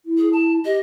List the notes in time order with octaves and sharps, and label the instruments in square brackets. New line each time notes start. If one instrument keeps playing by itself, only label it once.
[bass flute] E4
[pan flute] G#4
A5
[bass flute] G4 [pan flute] D#5